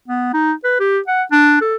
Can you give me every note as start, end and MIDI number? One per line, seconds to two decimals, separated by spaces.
0.08 0.32 59
0.34 0.52 63
0.64 0.79 71
0.80 0.99 67
1.08 1.23 78
1.32 1.58 62
1.61 1.76 69